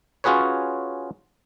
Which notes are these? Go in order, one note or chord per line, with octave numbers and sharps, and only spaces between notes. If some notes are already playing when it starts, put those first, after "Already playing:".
C#4 F4 F#4 G#4 B4 C#5